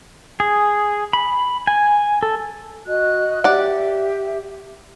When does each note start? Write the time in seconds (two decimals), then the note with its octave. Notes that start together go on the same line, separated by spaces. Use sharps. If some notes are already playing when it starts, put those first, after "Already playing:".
0.40 G#4
1.13 B5
1.67 G#5
2.23 A4
2.87 F#4 D#5 F#6
3.44 G4 D5 E5 F#5